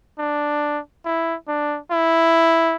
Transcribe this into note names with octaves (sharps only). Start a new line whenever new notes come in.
D4
E4
D4
E4